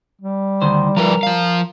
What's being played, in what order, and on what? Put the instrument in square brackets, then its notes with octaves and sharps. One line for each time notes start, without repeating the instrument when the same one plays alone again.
[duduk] G3
[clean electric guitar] D2 D#3 C5
[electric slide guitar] F3 B4 [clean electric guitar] A#4
[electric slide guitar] F3 F5